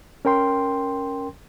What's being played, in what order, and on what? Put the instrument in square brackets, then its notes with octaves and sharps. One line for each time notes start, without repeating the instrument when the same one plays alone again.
[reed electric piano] C#4 A#4 G5 C6